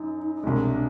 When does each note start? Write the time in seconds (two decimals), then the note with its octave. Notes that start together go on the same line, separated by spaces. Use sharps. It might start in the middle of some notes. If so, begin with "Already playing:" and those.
Already playing: F#2 D#4
0.35 D#4
0.43 C2 B2 G#3 D4